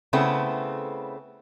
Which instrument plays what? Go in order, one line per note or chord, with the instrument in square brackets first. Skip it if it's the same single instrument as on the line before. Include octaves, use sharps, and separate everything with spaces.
[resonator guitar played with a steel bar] C#3 A3 B3 C4 E4